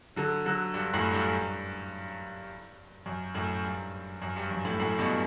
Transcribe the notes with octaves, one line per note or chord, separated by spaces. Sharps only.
D3 F#3
D3 F#3
G2
F#2 A2
G2
F#2
F#2 A2
G2
F#2
G2
F#2
F#2 A2
F#2 A2
G2 B2